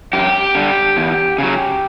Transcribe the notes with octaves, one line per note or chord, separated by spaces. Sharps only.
F#2 G4
D3 G3
E2
C#3 F#3